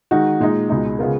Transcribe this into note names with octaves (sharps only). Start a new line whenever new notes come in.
D#3 G#3 D#4 F#4
A#2 G#3 D#4
C#2 B2 G#3 D#4
C#3 G#3 B3 F4 A#4